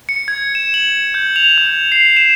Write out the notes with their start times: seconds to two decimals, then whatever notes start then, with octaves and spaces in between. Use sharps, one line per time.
0.09 C#7
0.28 G#6
0.55 E7
0.74 F#7
1.14 G6
1.36 F7
1.58 G6
1.92 C7
2.17 E7